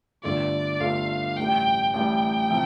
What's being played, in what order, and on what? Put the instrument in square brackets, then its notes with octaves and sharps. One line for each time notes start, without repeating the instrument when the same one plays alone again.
[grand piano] G1 G2 D3 A3 F4 [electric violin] D5
[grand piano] G1 G2 D3 A3 F4 [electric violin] F5
[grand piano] A1 A2 G3 [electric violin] G5
[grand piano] A1 A2 G3 [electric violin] G5
[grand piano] C3 F3